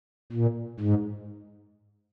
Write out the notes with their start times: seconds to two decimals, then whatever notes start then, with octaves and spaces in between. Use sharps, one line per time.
0.32 A#2
0.80 G#2